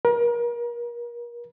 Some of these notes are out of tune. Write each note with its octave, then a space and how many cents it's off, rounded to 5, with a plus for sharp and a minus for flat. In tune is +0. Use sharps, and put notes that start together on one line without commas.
A#4 +35